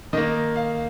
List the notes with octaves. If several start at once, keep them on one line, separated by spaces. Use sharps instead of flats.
D#3 A#3 D#5
F5